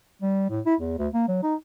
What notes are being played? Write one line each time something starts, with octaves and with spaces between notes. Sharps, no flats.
G3
A2
E4
E2
D2
A#3
F#3
D#4